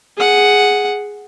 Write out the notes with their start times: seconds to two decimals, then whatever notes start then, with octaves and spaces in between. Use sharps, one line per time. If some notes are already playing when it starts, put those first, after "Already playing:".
0.17 G#4 F#5